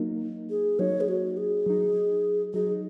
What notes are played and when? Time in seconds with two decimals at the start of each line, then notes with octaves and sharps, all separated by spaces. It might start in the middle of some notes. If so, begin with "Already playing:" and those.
Already playing: F#3 A#3 D#4
0.50 G#4
0.79 F#3 A#3 D#4 C#5
1.01 G#4
1.08 F#4
1.37 G#4
1.66 F#3 D#4
2.54 F#3 D#4 G#4